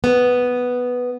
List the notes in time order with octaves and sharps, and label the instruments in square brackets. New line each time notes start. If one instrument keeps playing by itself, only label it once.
[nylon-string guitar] B3